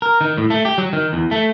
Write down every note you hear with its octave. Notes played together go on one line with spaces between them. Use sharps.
A#4
D#3
A2
A3
G4
F#3
D#3
E2
A3